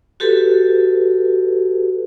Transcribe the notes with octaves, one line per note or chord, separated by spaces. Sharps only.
F#4 G4 A4 B4